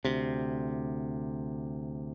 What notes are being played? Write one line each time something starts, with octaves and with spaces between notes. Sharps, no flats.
D2 C3